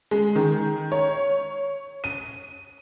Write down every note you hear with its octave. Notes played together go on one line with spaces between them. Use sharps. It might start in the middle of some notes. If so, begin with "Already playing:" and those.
G#3
D#3
C#5
D#7